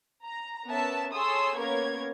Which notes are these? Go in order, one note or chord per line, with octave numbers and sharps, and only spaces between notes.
A#5
B3 C#4 A#4 E5 A5
G#4 A4 C#5 C6 D#6 E6
A#3 B3 C#4 A#4 C#5 G#6